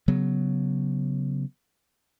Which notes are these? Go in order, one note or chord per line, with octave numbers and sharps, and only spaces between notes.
C#3 F#3 B3